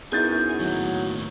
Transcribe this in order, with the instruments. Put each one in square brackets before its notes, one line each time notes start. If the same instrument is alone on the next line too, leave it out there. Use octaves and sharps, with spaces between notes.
[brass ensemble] F#2 [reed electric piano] B3 D#4 E4 [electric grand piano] G#4 G6 A6 [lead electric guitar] G#5
[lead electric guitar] D#2 A2 [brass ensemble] F#3